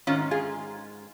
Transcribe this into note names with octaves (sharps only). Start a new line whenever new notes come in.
G#2 D#3 G#3 C#4 F4
F4 G#4